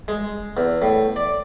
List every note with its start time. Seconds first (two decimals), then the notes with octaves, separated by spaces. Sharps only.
0.08 G#3
0.57 E2
0.82 A2
1.16 D5